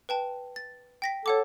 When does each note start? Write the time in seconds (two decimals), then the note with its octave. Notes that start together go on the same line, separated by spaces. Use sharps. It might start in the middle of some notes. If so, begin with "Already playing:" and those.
0.09 B4 G5 A5
0.56 A6
1.02 G5 A#6 B6
1.26 A4 C#5 F#5 D6